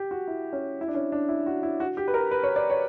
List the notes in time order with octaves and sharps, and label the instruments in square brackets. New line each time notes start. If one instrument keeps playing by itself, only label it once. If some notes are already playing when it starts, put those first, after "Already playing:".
Already playing: [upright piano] G4
F#4
E4
C#4
E4
D4
C#4
D4
E4
F#4
E4
F#4
G4
B4
A#4
B4
C#5
D5
C#5